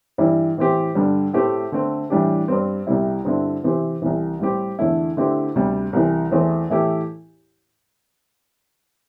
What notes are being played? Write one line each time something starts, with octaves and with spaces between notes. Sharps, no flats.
G2 E3 G3 E4
A2 E3 C4 G4
G2 D3 G3
A2 A3 C4 G4
D3 A3 C4
A2 E3 G3 D4 G4
G2 G3 C4
C2 C3 G3 E4
G2 D3 C4 E4
C3 E3 C4 G4
C2 C3 E3
A2 G3 C4 G4
E2 D3 A3 E4
D3 A3 C4 E4 G4
D2 C3 G3
C2 C3 E3
E2 E3 A3 C4
A2 E3 A3 E4 G4